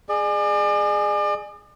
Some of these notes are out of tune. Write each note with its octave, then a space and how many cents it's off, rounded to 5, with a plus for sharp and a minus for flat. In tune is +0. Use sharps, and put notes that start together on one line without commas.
G#4 +0 D5 +40